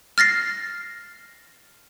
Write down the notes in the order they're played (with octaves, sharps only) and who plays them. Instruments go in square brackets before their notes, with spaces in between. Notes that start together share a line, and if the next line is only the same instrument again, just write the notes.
[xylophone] F6 A6 A#6 C7